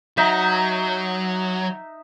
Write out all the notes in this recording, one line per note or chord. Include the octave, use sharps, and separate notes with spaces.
F#3 D#4 E5